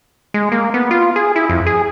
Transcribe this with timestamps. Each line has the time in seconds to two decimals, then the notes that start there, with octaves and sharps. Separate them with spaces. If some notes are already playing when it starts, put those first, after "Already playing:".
0.34 G#3
0.52 A#3
0.74 B3
0.91 F4
1.16 G#4
1.36 E4
1.49 F2
1.66 G#4